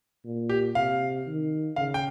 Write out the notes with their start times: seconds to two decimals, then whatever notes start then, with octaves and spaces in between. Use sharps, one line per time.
0.25 A#2
0.49 G4
0.75 C3 F5
1.26 D#3
1.76 C#3 F5
1.94 G5